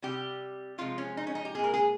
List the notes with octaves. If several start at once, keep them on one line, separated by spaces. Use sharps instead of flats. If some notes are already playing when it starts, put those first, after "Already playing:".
C3 G3 G4
C3 F3 G#3 F4
C#4
D#4
C#4
D#4
G4
A#2 G#3 G#4 A#4
G#4